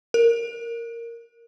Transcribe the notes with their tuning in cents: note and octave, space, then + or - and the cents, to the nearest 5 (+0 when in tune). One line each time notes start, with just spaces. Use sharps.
A#4 -5